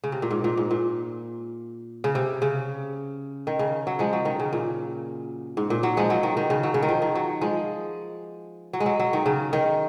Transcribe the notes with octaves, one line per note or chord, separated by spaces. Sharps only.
C#3
C3
A#2
G#2
A#2
G#2
A#2
C#3
C3
C#3
D#3
C#3
F#3
F3 G#3
F#3
D#3
C#3
A#2
G#2
A#2
F#3
F3 G#3
F#3
D#3
D#3
C#3
F#3
C#3
D#3
F3
D#3
F#3
F3 G#3
F#3
G#3
F#3
F#3
D#3
C#3
D#3